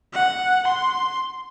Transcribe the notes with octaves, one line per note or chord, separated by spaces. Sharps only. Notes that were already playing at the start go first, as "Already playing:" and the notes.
F#5
C6